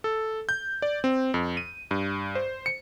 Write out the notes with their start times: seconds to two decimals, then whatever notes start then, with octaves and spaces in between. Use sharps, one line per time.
0.04 A4
0.49 G6
0.82 D5
1.04 C4
1.34 F2
1.57 D#7
1.91 G2
2.35 C5
2.66 C#7